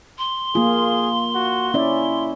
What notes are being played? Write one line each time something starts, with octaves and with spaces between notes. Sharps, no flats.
C6
A#3 F4 G#4
F#4
C#4 E4 D5